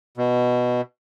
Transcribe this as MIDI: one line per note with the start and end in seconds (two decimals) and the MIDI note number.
0.17 0.81 47